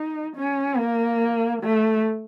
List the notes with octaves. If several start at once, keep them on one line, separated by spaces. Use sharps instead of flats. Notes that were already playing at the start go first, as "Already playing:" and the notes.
Already playing: D#4
C#4
A#3
A3